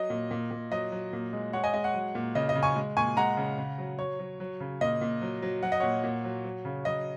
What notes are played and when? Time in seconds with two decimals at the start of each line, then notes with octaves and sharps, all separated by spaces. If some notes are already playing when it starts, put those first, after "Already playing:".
Already playing: F#3 D#5
0.10 A#2
0.31 A#2
0.51 A#2
0.71 F#3 D#5
0.92 F#3
1.13 A#2
1.33 G#3
1.53 G#3 C#5 F#5
1.64 D#5 G#5
1.74 G#3 D#5
1.84 C#5 F#5
1.94 F#3
2.15 A#2
2.35 C#3 D#5
2.49 D#5
2.55 C#3
2.63 G#5 C#6
2.76 G#3
2.97 A#2 G#5 C#6
3.17 G#3 F#5 A#5
3.37 C#3
3.58 C#3
3.78 F#3
3.99 F#3 C#5
4.19 F#3
4.40 F#3
4.60 C#3
4.81 A#2 D#5
5.01 A#2
5.22 F#3
5.42 F#3
5.63 F#3 F#5
5.72 D#5
5.80 A#2 C#5 F#5
6.04 A#2
6.24 F#3
6.45 F#3
6.65 C#3
6.85 F#3 D#5